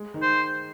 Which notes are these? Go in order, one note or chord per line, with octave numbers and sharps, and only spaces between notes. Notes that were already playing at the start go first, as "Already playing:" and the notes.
Already playing: G#3
D#3
C5